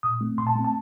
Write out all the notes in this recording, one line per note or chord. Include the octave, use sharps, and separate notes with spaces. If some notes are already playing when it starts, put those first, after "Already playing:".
A#2 D#6
A3 C4
A#2 C6
A5
A3 C4
A5